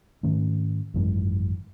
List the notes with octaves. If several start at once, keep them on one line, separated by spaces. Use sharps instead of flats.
G#2 D#3 A3 C#4
G#1 F#2 E3 G#3